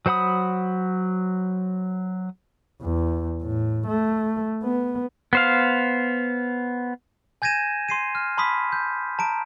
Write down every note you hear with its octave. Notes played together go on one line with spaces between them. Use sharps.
F#3 C5 F#5 B5 D#6
E2
A2
A3
B3
B3 C5 F5
G#5 G6 G#6 A#6 D#7 E7
C6 C7 D#7
F6
A5 B5 C6 D6 D#6 B6
G6
A5 A#5 D7